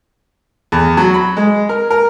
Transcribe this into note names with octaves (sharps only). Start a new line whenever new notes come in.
E2
F#3
B5
G#3
A#4
A#4